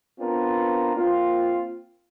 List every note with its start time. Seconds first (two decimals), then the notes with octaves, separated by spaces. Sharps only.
0.19 B3 C4 D4 F4 A#4
0.96 A#3 C4 F4